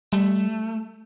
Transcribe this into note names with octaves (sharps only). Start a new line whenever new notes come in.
G3 A3